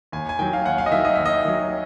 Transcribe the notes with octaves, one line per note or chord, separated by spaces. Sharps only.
D#2 G#5
G#5
D#3 F#3 G5
F5
D#2 F#5
F5
D#5
D#3 F#3 E5
D#5
D#2 E5
D#5
D#3 F#3